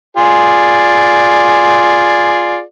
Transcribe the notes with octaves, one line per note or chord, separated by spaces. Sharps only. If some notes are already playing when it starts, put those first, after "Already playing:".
F4 G#4 D5